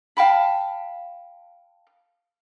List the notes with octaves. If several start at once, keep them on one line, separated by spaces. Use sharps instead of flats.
F5 G5 A5 B5